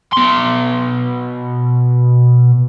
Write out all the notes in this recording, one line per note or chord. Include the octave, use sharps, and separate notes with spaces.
B2 C6